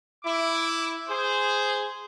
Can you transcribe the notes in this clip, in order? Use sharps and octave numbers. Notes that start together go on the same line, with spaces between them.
E4 D6
G#4 C5